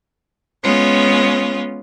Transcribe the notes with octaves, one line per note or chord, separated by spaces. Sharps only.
G#3 B3 C#4 F4